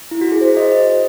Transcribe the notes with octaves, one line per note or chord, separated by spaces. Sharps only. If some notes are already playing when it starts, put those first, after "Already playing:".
E4
F#4
G#4
C5
D#5
D#5